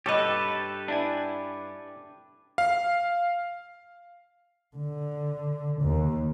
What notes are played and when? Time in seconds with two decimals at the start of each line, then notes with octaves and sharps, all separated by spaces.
0.06 G2 G4 A4 B4 C#5 D#5
0.88 D4 E4 G#5
2.58 F5
4.76 D3
5.81 D#2